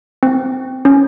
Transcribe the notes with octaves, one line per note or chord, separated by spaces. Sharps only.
C4
C#4